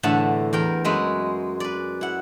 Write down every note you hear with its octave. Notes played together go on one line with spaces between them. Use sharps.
E2 A2 D3 E5 F#5 A5
E2 A#4 G5
F#2 G#3 B4 E5
B4 D5
E4 F#5